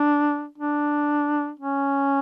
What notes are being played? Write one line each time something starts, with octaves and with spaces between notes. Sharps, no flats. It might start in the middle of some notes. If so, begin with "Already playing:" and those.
Already playing: D4
D4
C#4